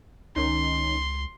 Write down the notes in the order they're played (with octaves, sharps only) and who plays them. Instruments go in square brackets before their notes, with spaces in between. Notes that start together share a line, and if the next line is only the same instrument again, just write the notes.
[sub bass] C#2 [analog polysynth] D#3 C#4 D#4 [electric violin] C6